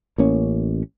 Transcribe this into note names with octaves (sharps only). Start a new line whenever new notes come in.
A1 A#3 C#4